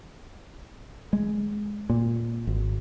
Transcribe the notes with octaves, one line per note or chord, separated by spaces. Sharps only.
G#3
A#2
G#1